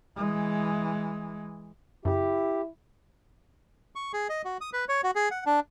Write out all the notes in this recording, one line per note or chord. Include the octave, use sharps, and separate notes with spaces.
E3 G#3
F#2 C#3 E4 G4
C#6
G#4
D#5
F#4
D#6
B4
C#5
F#4
G#4
F#5
D4